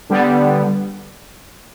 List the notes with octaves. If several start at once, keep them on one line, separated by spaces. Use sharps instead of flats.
D3 G3 B3